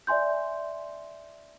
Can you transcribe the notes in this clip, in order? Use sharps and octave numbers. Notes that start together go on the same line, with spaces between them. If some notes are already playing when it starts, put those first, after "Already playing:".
D5 E5 G#5 C6 G6